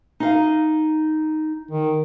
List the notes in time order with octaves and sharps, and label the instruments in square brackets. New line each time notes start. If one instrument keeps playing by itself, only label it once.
[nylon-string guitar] D#4 F5
[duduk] D#3